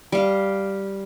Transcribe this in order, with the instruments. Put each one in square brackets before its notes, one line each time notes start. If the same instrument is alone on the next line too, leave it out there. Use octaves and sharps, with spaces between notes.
[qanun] G3 F5